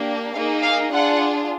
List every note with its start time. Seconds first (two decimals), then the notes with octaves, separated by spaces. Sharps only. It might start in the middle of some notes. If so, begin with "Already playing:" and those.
Already playing: A#3 D4 G4
0.34 A#3 D#4 G#4 F5
0.62 F5
0.91 D4 F4 G#4 F#5